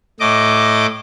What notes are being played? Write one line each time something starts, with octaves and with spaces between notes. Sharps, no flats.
A2 D#5 D6